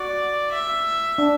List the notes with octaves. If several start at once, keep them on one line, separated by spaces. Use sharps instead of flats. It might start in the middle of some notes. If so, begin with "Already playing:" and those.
Already playing: F#4 D5
E5
D4